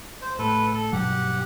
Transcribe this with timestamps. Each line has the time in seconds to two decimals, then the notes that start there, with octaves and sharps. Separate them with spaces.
0.22 C5
0.39 A2 A4 B4
0.73 A4
0.93 G2 B2 F#3 G4 F#5